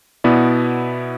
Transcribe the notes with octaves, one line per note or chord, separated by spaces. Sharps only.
B2 B3 E4 D5